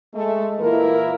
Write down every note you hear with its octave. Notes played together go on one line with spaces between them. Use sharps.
G#3 A3
A#2 E3 A#3 E4 A#4